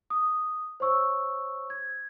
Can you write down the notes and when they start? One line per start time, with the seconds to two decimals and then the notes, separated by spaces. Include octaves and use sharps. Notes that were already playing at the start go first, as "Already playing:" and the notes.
0.10 D#6
0.80 C5 C#5 C#6 E6
1.70 G#6